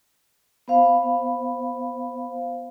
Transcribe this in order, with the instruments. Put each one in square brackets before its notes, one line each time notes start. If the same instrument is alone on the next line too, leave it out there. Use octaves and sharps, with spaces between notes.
[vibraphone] B3 C5 F5 B5